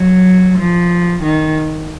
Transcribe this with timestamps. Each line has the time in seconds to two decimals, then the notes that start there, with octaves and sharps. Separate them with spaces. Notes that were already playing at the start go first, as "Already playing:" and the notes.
Already playing: F#3
0.58 F3
1.23 D#3